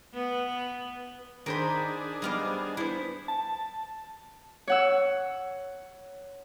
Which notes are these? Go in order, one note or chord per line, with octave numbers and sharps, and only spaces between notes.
B3
D#3 D4 G#4 A#4 C5 B5
G3 B3 C5 D#5 F5 D6
B3 E4 C5
A5
C#5 F#5 E6